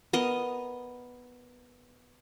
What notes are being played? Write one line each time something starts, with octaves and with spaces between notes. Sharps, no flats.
B3 A#4 D#5